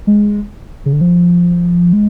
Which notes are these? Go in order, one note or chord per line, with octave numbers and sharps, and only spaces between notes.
G#3
C#3
D3
F3
G#3